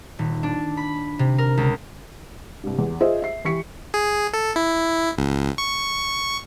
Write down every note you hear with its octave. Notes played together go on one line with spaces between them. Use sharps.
D#1
D4
B5
C3
A#4
C#2
C2 G2
E2
F4 G#4 C5 D#5 E5
E5 C7
E3 G4 C#6 B6 C#7
G#4
A4
E4
C#2
C#6